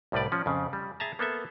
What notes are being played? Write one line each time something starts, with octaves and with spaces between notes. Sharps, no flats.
C2 A2 G3 B4 D5
F3 C#4
F2 C#3
G3
G#4 E5 A5 A#5
A#3 B3 A4 E5